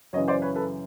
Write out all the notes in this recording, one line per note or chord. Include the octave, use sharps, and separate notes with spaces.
F#2 C#3 E3 C#5 D#5
C5 D5
B4 C#5
A4 B4